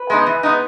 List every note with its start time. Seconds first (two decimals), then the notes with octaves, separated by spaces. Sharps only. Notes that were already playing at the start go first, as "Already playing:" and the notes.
Already playing: B4
0.10 G#3 B3 D#4
0.26 E3
0.43 G#3 B3 D#4